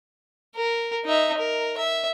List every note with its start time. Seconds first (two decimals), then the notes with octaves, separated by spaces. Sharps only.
0.56 A#4
1.05 D#4 E5
1.38 A#4
1.78 E5